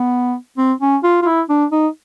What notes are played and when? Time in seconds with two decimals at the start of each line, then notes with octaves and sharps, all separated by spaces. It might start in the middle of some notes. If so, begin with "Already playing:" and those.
Already playing: B3
0.57 C4
0.81 C#4
1.04 F4
1.22 F4
1.26 E4
1.49 D4
1.72 D#4